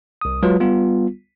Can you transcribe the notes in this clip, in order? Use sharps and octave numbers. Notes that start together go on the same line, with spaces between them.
C2 D#6
F#3 G#3 F4 B4
G3 B3 F4